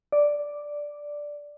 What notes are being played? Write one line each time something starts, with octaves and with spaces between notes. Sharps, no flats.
D5